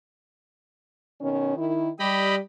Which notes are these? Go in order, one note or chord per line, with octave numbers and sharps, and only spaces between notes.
B2 D#3 C#4
D#3 E4
G3 G4 D#5 B5